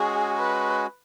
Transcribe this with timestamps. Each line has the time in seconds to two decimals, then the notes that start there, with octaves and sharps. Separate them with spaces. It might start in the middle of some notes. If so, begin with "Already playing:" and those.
Already playing: G#3 C#4 F#4 G#4
0.38 B4